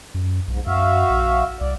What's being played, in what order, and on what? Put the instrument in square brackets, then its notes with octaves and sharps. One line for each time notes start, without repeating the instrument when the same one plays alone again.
[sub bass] F#2
[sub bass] B1 [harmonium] G#2
[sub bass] F#2 [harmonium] F#4 E5 F5
[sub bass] A#1
[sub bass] C2 [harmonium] D5